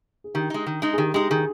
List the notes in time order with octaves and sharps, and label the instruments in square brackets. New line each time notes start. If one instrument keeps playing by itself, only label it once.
[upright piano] G#4
[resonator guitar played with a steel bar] D#3 [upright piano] G4
[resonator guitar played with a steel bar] G#3 D#4
D#3
G#3 D#4
[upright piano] G#4
[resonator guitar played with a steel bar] D#3 [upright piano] G4
[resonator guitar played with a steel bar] G#3 D#4 [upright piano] G4
[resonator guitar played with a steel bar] D#3 [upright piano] G#4